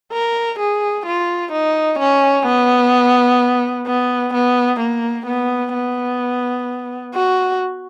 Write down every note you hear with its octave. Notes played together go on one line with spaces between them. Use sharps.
A#4
G#4
F4
D#4
C#4
B3
B3
B3
A#3
B3
B3
F#4